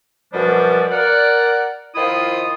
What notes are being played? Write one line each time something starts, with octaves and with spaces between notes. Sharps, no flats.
F#2 B2 F3 G3 D4
A#4 D5 F#5
D#3 F3 E4 F4 D#6